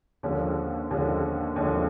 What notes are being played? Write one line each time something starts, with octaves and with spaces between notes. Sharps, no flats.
D#2 D3 F3 G#3 C#4
D#2 D3 F3 G#3 C#4
D#2 D3 F3 G#3 C#4